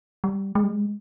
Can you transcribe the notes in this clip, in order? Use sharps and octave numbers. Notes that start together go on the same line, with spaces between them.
G3
G#3
G3
G#3